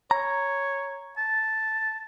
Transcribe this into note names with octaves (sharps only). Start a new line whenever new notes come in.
C#5 A#5
A5